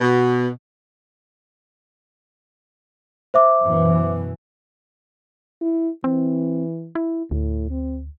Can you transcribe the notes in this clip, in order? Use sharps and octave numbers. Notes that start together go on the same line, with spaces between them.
B2
C5 E5 D6
F#2 B2 E3
E4
E3 C4
E4
D2 A2
C4